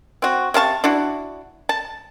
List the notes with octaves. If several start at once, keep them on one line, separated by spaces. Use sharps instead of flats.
C4 F#4
C3 F5 A5 C#6
D4 E4 F#4
A5